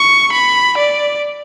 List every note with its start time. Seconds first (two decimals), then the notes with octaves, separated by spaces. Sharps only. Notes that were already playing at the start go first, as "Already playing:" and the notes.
Already playing: C#6
0.32 B5
0.77 D5